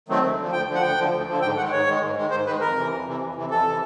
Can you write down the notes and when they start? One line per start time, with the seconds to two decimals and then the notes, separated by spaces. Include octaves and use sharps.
0.08 D#3 F#3 A3 C4
0.22 D2
0.37 D3 F3
0.52 D2 G5
0.67 D3 F3
0.75 F#5
0.82 D2 G5
0.97 D3 F3
1.13 D2
1.27 D3 F3
1.42 G#2 G5
1.57 D#3 G#3 F#5
1.72 G#2 C#5
1.86 D#3 G#3
2.01 G#2
2.16 D#3 G#3
2.31 G#2 C5
2.46 D#3 G#3 B4
2.61 F2 A#4
2.76 C3 E3
2.91 F2
3.06 C3 E3
3.21 F2
3.35 C3 E3
3.51 F2 A4
3.65 C3 E3